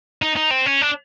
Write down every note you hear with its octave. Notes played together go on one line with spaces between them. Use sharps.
D#4
D#4
C4
C#4
D4